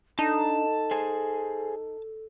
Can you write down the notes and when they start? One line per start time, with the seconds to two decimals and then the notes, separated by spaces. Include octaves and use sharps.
0.19 D4 D#4 A4 A5
0.91 G#4 C5 G#5